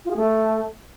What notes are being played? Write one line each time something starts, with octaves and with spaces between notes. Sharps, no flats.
F4
G#4
A3